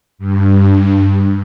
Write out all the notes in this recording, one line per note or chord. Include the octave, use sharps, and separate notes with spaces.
G2